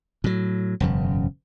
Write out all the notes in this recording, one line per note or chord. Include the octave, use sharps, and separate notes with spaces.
A2 F#3
E1 F#2 C#3